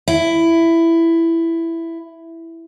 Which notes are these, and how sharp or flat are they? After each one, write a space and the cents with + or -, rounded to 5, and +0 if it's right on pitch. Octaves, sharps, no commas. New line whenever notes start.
E4 +10